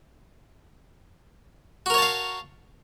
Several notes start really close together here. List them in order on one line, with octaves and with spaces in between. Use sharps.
F#4 A#4 C#5 A5 F5